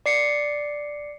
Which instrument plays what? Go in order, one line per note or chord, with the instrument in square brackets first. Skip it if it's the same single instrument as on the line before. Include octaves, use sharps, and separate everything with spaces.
[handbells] D5 C7 C#7